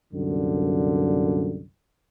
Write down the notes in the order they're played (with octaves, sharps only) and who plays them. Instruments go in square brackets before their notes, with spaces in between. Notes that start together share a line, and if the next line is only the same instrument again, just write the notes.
[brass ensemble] C2 F#2 A#2 D3